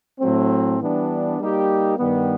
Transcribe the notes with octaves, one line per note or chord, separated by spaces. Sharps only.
A2 F#3 A3 C4
E3 G3 B3 D4
G3 A#3 D#4 G4
G2 D#3 G3 B3